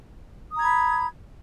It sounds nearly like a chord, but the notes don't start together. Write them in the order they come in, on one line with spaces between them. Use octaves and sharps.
D#6 A#5 G#6 B5